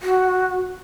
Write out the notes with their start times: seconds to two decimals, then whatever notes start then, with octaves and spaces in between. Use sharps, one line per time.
0.01 F#4